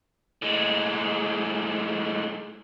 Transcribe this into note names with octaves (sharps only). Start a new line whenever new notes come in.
A2 G#3